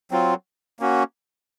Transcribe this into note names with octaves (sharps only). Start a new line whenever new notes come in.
F#3 C4 F4
A#3 C#4 F#4